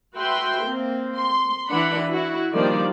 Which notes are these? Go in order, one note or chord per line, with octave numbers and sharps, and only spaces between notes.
F#4 B4 E5 G5 C6
A#3 C4
C6
E3 D4 F#5 B5
E4 F#4
D#3 F3 G3 A#3 D4 D5